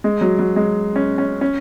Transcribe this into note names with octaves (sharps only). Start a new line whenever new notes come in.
G#3
F#3
F#3
G#3
C#4
C#4
C#4